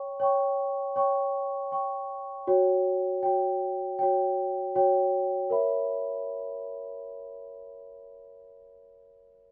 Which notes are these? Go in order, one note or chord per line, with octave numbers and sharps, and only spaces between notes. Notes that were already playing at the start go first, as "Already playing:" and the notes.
Already playing: C#5 G5 C#6
C#5 G5 C#6
C#5 G5 C#6
C#5 G5 C#6
F#4 C#5 G5
F#4 C#5 G5
F#4 C#5 G5
F#4 C#5 G5
A#4 C#5 E5 B5